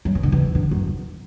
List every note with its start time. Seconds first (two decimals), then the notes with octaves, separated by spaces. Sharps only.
0.05 F#3
0.15 E3
0.23 D3
0.32 E3
0.55 D3
0.71 F#2